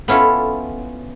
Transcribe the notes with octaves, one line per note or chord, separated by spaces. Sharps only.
B3 C#4 E4 F4 A4